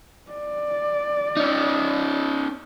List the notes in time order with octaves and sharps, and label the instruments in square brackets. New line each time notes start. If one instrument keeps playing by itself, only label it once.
[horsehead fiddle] D5
[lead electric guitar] C#4 D#4